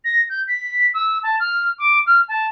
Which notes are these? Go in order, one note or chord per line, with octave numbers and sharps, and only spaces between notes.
A#6
G6
B6
E6
A5
F6
D6
F6
A5